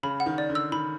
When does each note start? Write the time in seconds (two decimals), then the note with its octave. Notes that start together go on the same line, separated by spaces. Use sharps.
0.03 C#3 B5
0.20 F#5
0.26 D#3
0.38 D5
0.50 D3
0.55 E6
0.72 D#3 B5